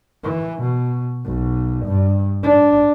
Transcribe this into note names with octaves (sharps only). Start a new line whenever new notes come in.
E3
B2
B1
G2
D4